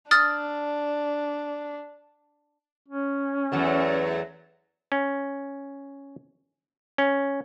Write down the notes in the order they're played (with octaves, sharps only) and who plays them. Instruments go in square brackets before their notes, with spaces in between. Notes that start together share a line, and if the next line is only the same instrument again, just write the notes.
[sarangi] D4 [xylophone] D#6 F6 A6
[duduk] C#4
[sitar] E2 F#3 A3
[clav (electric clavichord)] C#4
C#4